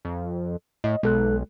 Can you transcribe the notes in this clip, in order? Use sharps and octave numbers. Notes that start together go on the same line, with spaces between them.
F2
A2 D#5
B1 G#3 A4 F#6